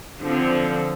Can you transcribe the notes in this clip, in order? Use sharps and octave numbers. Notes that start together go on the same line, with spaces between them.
D3 F3 C4